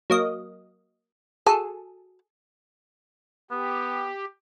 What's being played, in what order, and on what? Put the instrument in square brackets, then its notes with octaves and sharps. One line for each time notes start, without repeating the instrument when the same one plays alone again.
[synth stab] F#3 A#3 D#5
[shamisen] F#4 A5 [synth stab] G#4 A4
[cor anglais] B3 [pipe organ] G4